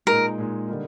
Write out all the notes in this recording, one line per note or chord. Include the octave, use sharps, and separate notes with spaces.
A#2 G#3 D#4 A#4
A#2 G#3 D#4
D3 G3 A#3 D#4 A#4